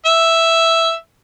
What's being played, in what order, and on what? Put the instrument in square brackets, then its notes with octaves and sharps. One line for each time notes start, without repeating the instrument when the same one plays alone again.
[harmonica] E5